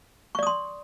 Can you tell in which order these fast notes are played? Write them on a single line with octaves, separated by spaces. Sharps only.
C#6 D5 D#6 C6